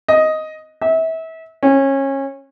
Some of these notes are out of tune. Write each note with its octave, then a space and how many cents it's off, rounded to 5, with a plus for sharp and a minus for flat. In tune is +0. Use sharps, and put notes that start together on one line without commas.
D#5 +5
E5 -30
C#4 -25